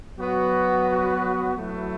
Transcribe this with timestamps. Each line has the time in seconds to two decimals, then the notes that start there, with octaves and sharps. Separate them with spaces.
0.17 F#3 B3 F#4 B4
1.56 F#3 A3 E4